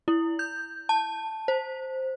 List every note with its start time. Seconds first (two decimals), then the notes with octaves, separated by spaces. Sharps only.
0.08 E4
0.39 G6
0.89 A5
1.48 C5